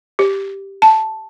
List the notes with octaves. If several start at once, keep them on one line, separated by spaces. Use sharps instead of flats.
G4
A5